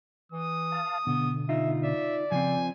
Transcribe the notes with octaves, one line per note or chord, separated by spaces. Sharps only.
E3 D#6
F5 A5
B2 D3 B3
D#4 F4 E5
D5 E5
C#3 F3 C4 G#5